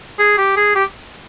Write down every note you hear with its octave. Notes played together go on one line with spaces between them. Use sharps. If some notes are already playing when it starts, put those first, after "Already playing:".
G#4
G4
G#4
G4